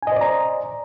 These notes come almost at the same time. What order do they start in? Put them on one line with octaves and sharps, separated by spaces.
G#5 D#5 C5 D5 A#5